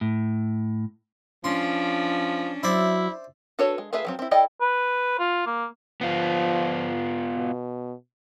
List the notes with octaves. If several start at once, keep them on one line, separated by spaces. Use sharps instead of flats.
A2
F3 C#4 D4 C6
F#3 E4 C5 D5 E5
D4 F#4 A4 B4 C#5
G#3
A3 F4 G#4 B4 E5
F3 F#3 C4
C4 E4
E4 A4 D5 D#5 G5
B4
F4
A#3
F3 B3 F4
B2